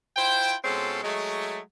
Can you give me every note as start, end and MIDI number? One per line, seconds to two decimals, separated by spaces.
0.16 0.53 64
0.16 0.53 65
0.16 0.53 72
0.16 0.53 79
0.64 1.00 47
0.64 1.00 56
0.64 1.00 60
0.64 1.00 61
0.64 1.00 65
0.64 1.00 69
1.03 1.59 54
1.03 1.59 56
1.03 1.59 57